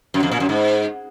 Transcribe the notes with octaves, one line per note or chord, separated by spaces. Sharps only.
F#2
F2
A#2
F#2
G#2